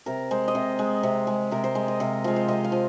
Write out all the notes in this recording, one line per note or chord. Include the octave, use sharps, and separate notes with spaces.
C3 A#4
G#3 C5
D#5
C3 C5
G#3
C3
G#3
C3 A#4
C5
G#3
D#5
C3 F5
F3 G#3 F5
C5
C3 D#5
F5
F3